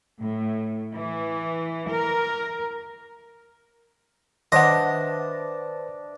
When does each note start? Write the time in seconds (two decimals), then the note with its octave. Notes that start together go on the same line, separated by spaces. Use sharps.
0.20 A2
0.93 E3
1.87 A#4
4.52 D#3 D4 B4 C5 D#5 E5 F#5 A5